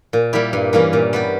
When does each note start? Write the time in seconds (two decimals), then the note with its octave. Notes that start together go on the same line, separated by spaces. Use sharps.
0.13 A#2
0.33 G3 A#3 E4 G4
0.53 G2
0.73 E3 G3 A#3 C#4
0.93 A#2
1.13 G3 B3 G4